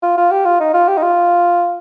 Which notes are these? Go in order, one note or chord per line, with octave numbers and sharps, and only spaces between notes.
F4
F4
G4
F4
D#4
F4
G4
D#4
F4